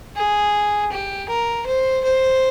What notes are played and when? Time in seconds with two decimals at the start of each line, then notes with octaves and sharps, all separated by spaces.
0.16 G#4
0.92 G4
1.29 A#4
1.66 C5
2.04 C5